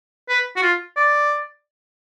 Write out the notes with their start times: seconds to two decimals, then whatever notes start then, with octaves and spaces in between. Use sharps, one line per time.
0.29 B4
0.56 F#4
0.62 F4
0.96 D5